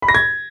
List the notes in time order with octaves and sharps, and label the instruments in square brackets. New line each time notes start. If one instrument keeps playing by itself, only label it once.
[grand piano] B5
A#6
G#6